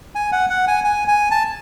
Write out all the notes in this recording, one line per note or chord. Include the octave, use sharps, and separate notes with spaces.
G#5
F#5
F#5
G#5
G#5
G#5
A5